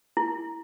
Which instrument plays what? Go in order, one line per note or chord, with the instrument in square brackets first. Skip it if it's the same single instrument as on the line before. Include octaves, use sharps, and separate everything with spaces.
[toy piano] E4